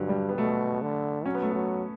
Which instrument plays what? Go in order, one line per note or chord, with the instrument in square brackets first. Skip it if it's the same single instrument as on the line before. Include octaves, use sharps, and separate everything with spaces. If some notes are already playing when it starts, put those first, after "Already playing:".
Already playing: [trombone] G2 [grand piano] D3 F#3
[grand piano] G3
B3
[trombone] B2 [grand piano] A3
[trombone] D3
[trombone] F#3 [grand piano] C#4
[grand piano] B3
A3
B3
[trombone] F#3